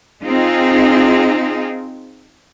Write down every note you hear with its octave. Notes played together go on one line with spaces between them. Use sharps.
C4 D#4 F4 G#4